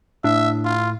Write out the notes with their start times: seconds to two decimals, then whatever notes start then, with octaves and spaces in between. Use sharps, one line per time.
0.24 A2 D4 E5
0.65 F4